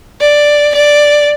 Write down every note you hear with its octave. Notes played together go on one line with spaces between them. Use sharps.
D5
D5